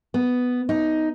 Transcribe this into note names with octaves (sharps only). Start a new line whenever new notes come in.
B3
D#4